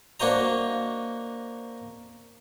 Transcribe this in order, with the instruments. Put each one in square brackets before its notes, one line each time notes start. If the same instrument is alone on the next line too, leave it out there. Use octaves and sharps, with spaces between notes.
[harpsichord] A#3 D4 F#4 C5 D#5 A#5